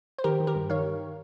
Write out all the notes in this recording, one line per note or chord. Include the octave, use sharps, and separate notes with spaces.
C5
D#3 G4 A#4
D#3
G4 A#4
G2
D#3 C#5 F5